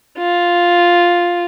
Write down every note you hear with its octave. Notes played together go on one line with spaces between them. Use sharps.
F4